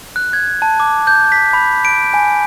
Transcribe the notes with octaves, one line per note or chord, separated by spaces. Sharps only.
F#6
G#6
A5
D6
G6
B6
B5
D7
G#5